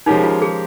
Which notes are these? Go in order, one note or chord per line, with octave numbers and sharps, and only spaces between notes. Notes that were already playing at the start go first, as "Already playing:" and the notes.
F3 G#3 C#4 D#4 G4 A#4
F4
G#4